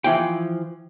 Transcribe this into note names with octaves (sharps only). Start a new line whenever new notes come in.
E3 F3 G5